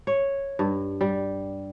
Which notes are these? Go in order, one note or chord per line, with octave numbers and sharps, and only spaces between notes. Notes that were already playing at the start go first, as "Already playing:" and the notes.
C#5
G2
G3